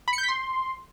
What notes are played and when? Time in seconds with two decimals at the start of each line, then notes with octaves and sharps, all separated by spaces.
0.08 B5
0.13 C#7
0.18 G6
0.23 B6
0.28 C6